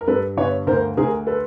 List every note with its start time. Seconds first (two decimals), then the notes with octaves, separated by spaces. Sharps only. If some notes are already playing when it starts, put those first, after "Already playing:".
0.01 A#4
0.07 G2 A4 B4
0.37 G1 B4 C#5
0.67 D2 A#4 C5
0.97 D2 G#4 A#4
1.27 A4 B4